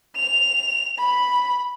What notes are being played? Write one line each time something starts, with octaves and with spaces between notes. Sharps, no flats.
F7
B5